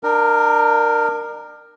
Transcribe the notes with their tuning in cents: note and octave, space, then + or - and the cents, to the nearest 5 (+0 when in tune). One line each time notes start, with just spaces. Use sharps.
D4 +35 A#4 +0 G5 +0